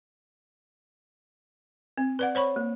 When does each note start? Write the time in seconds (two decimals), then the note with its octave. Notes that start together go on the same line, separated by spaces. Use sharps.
1.98 C4
2.19 B4 D5 F#5
2.35 C5 C#5 B5 C#6
2.56 A#3